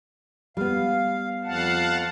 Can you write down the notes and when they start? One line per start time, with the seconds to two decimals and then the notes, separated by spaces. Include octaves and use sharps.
0.57 G3 B3 F5
1.44 F2 F5 F#5 A5